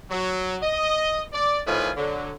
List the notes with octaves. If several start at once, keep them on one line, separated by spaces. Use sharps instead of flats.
F#3
D#5
D5
A2 D#3 F3 F4 B4 G#5
D3 F#3